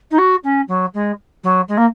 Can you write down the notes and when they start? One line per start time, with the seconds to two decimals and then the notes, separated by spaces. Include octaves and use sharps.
0.11 D#4
0.18 F#4
0.44 C#4
0.68 F#3
0.94 G#3
1.44 F#3
1.68 G#3
1.77 A#3